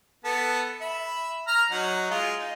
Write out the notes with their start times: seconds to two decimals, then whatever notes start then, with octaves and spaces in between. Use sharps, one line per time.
0.24 B3 A4
0.81 E5 B5
1.48 A#5 F6
1.71 F#3 D#4 F#5
2.11 G#3 F4
2.39 D#4